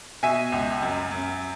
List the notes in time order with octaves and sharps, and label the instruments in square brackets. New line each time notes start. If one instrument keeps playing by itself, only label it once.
[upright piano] B2 E5 G#5
C#2
F#2
F#2